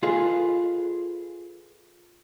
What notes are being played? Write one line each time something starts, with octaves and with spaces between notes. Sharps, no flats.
F4 G#4 A4 B4 D#5 F5